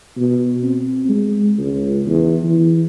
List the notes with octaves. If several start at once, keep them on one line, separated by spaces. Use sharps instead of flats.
B2
C4
G#3
C#2
E2
E3